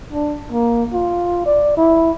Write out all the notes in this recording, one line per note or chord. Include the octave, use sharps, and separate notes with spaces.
D4
A#3
F4
D5
E4